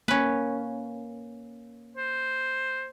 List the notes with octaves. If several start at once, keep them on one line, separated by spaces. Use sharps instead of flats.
A#3 C#4 B4
C5